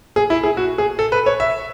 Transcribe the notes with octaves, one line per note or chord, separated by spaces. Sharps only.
G#4
E4
G#4
F#4
G#4
A4
B4
C#5
E5